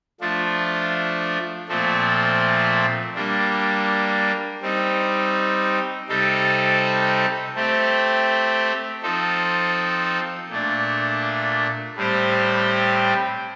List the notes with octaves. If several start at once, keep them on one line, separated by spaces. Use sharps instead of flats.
F3 A3 D4 F4
A#2 F3 A3 C4
G3 A#3 D4
G3 C4 D#4
C3 G3 C4 D#4 A4
A3 C4 G4
F3 C4 D#4 A4
A#2 A3 D4
A2 G3 C4 G4 C5